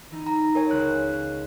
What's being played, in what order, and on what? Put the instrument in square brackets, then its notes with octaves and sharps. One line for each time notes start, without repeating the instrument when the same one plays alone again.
[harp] E3 D#4
[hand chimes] A#5
A#4 C#5 G#5
[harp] C#2 B4 [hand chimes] F#6